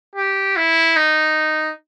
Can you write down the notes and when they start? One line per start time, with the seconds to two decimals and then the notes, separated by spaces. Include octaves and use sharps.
0.16 G4
0.56 E4
0.96 D#4